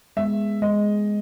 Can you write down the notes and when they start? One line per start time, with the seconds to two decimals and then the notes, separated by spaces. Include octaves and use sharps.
0.17 G#3 B3 E5
0.62 G#3 D#5